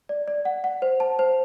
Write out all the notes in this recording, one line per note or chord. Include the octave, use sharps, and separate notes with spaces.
D5
D5
F#5
F#5
C5
A5
C5